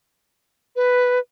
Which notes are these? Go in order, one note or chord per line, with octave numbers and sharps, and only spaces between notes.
B4